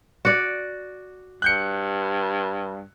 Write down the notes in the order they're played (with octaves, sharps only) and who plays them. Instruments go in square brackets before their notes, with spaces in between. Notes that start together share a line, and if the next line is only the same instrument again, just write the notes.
[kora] F#4 D5
[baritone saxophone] G2 [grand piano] F#6 G6 C#7